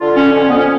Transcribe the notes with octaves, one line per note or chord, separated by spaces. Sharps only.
D3 F4
C#4
F2 C#4
B3
C#4